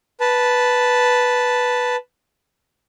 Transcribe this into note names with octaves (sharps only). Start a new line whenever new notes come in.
B4 A5